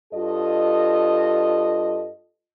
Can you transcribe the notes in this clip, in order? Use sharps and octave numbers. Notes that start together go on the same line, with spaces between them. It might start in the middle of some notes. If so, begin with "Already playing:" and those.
G2 F4 A4 D#5